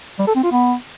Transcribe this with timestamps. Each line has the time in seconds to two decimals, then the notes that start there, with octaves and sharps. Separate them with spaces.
0.19 G3
0.27 A4
0.35 C4
0.43 F4
0.51 B3